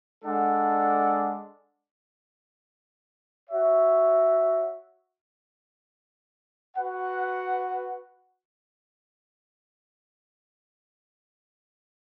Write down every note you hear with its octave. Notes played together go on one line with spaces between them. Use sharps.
G#3 D4 A4 D5 F#5
F#4 C#5 E5
F#4 B4 F#5